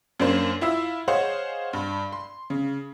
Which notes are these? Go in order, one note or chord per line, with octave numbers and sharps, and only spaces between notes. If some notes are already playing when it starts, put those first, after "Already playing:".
F#2 A#3 D4 C5 C#5
E4 F4 E5 F5 E6
G#4 C5 C#5 D#5 F5 F#5
G2
C6
C#3